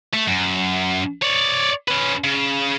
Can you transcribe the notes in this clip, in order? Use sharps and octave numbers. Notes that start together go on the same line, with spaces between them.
A3
F#2
C#5 D5
C#4 B4
C#3